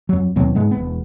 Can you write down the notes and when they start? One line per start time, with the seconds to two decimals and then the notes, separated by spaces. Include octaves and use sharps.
0.09 F2 F#3
0.36 D#2 B2 F#3 C4
0.55 G#2 G#3 B3
0.71 E1 B3